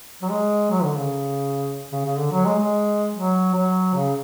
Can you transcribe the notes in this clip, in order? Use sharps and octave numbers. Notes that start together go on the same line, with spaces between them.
F#3
G#3
F#3
D3
C#3
C#3
C#3
D3
F#3
G#3
G#3
F#3
F#3
C#3